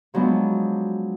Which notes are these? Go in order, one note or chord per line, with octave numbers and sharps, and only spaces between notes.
F3 F#3 G#3 B3 D4